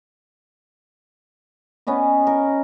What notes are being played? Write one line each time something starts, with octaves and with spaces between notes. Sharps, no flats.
B3 C#4 B4 D#5
A#4